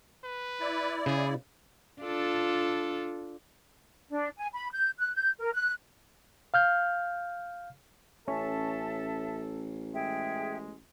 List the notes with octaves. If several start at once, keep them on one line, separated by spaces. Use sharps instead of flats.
B4
E4 D5
C#3 G#4
D4 F4 A4
D4
G#5
B5
G6
F#6
G6
A#4
F#6
F5 F6 G6
A1 C#4 A4 E5 A5
G#3 G#4 E5 G5